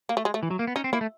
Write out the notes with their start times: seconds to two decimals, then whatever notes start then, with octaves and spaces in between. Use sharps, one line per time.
0.09 A#3
0.17 A3
0.25 G#3
0.34 A3
0.43 E3
0.51 F#3
0.59 A#3
0.67 B3
0.76 C#4 D#4
0.84 C4
0.93 A#3 E4
1.01 A3